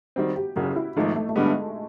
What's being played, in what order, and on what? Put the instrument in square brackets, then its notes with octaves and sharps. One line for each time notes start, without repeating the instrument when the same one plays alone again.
[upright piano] D#3 G3 C4 [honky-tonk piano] F#4
[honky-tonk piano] G4
[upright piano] F#1 F#2 C#3 [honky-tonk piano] F#4
[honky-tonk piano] E4
[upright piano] G#1 G#2 F3 A3 [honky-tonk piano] D#4
[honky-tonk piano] A3
A3
[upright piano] G2 D3 G3 B3 [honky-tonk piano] G#3